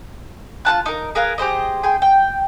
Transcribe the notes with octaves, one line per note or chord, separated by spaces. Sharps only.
F4 F#4 A5 F#6
D#4 A#4
G#4 A#4 B4 F5
G4 G#4 C5 D#5
G#4 G5 C6
G5